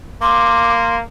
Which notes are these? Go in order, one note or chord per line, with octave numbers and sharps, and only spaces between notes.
A#3 C6 D6